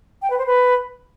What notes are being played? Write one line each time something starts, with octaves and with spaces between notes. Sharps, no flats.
G5
B4
C5
B4